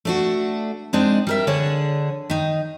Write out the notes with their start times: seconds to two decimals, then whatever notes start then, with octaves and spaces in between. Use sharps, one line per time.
0.05 A3 D4 F#4
0.93 G#3 C4 D4 D#4
1.27 G3 A#4 E5
1.47 D3 D4 G#4 C#5
2.30 D#3 D#4